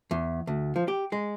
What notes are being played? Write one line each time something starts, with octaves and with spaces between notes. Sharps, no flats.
E2
D2
F3
G4
G#3